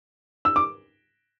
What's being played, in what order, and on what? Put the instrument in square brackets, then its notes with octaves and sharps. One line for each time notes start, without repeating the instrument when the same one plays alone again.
[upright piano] E6
D6